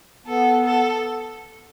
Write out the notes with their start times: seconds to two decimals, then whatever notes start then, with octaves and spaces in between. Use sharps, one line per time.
0.26 B3 A4
0.65 A4